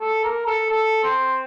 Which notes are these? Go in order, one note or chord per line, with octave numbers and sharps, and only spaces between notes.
A4
A#4
A4
A4
C4